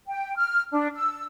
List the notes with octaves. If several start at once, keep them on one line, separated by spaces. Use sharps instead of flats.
G5
F6
D4
E6